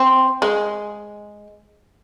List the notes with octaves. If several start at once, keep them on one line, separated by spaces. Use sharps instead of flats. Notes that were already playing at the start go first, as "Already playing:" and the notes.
Already playing: C4
G#3